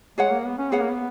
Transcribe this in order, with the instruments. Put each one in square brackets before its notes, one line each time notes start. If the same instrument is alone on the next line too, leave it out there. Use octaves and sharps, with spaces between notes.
[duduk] G#3 [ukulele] G#4 C#5 F#5
[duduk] A#3
B3
C#4
[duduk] B3 [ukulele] G#4 C#5 F#5
[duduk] A#3
B3